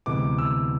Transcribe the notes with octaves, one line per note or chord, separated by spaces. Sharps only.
D2 C3 E3 G#3 B3 D6
E6